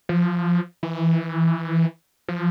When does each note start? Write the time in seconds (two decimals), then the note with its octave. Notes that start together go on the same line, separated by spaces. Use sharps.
0.09 F3
0.83 E3
2.28 F3